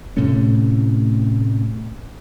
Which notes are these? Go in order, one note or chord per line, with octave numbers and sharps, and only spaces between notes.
A2 C3 A3 C#4